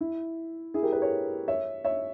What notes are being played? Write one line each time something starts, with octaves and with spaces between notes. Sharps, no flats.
E4
E4 G#4
G4 A#4
G#4 B4
A#4 C#5
C#5 E5
C#5 E5